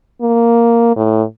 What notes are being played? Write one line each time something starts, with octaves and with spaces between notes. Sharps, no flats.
A#3
A2